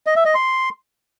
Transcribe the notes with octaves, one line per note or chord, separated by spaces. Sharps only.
D#5
E5
D#5
C6